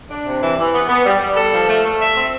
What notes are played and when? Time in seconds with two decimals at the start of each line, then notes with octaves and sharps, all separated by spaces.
0.09 D4
0.25 C3
0.41 E3
0.57 E3
0.73 B3
0.88 B3
1.05 G3
1.20 G3
1.36 A4
1.52 F3
1.68 A3
1.83 A3
1.99 E5
2.15 C4